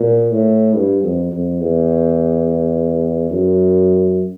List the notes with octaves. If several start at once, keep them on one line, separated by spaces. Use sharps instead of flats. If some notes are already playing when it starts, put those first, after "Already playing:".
Already playing: A#2
A2
G2
F2
F2
E2
F#2